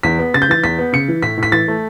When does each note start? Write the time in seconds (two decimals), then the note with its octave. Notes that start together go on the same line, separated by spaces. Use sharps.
0.03 E2 B6
0.19 B3
0.34 C#3 A6
0.42 G6
0.49 E3 A6
0.64 E2 B6
0.79 B3
0.93 C#3 C#7
1.08 E3
1.22 A2 B6
1.37 A2
1.43 B6
1.52 E3 A6
1.68 A3